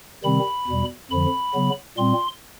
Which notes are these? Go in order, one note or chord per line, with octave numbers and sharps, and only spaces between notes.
C3 D#3 G3 C4 B5
E2 B2 G3
F2 D3 F3 B5
C#3 F#3 B3
A#2 G3 C4 C6